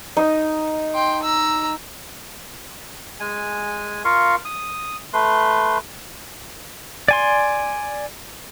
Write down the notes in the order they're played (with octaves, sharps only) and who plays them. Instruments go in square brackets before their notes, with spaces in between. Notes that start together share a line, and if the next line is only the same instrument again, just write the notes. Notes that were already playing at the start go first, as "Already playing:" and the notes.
[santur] D#4
[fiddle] G5 C6
A#5 E6
[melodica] G#3 G#5
F4 A#4 F5 C#6
D#6
A3 B4 C6
[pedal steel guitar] D5 G#5 C6